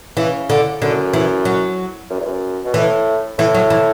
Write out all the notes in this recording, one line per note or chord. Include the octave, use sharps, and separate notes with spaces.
C#3 E3
D3
F#2 D3
E3
F#3
F#2
E2
F#2
B2
A2 E3
A2 E3
F#3
E3